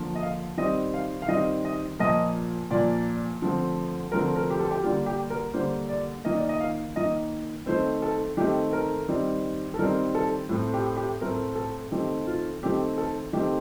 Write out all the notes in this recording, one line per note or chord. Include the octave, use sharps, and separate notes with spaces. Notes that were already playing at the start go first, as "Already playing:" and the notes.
Already playing: D3 F3 A#3
D#5
F5
D#3 G3 C4 D#5
F5
F5
D#3 G3 C4 D#5
D#5
A#2 F3 A#3 D#5
A#2 F3 A#3 D5
D3 F3 A3 C4
D3 F3 A3 C4 A#4
A#4
G4
A4
G4
D3 G3 A#3 F4
G4
A#4
D3 G3 A#3 C5
D5
D#3 A#3 D#5
D5
D#5
F5
D#3 A#3 D#5
D#3 A3 C4 C5
A4
D#3 A3 C4 G4
A#4
D#3 G3 C4
A4
D#3 G3 C4 A#4
A4
A2 A3 C4
G4
G4
A2 A3 C4 A#4
A4
D#3 A3 C4 G4
F4
D#3 A3 C4 G4
A4
D#3 A3 C4 G4